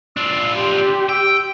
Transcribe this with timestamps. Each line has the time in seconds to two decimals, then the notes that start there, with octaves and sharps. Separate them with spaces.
0.17 D4 F4 E6
0.57 G4 C6
1.09 G5 E6